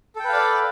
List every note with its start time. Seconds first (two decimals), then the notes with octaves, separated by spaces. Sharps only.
0.16 A4
0.20 G5
0.24 B4
0.29 F5
0.33 D5